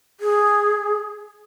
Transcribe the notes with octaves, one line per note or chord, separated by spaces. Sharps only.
G#4